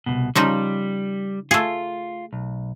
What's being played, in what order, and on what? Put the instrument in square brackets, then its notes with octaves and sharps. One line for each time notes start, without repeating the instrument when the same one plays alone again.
[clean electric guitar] C2 F2 B2
[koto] C#3 F3 D#4 [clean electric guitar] G3
[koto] A3 G#4 [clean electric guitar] F4
[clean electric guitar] B1